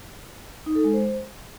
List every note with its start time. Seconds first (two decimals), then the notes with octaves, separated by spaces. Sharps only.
0.66 D#4
0.75 A4
0.84 G#3
0.93 C5